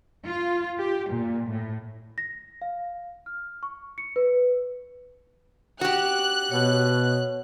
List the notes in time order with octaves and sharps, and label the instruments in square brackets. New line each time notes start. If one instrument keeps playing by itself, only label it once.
[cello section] F4
G4
A#2
A2
[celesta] A#6
F5
F6
C#6
C#7
B4
[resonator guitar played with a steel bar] F#4 G4 [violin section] F#6
[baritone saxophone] B2 [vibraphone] C#5